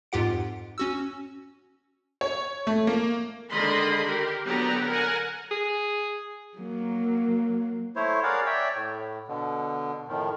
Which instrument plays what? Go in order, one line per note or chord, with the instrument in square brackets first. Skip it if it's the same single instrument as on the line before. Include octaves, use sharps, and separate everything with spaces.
[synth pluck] F2 G#2 F4 G4 F#5 D7
C#4 F#4 E6
[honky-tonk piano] C#5
A3
A#3
[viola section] D3 D#3 G#3 D#5 B5 C6
G4 A#4
D3 F#3 B3 G4 B4 A#5
A#4 F#5 G#5 A#5
[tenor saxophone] G#4
[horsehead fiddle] F#3 A#3
[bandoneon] A3 E4 C5 C#5
G#4 A#4 C#5 D5 F5 F#5
C#5 D5 E5 G5
A2
B2 D3
F2 A2 D#3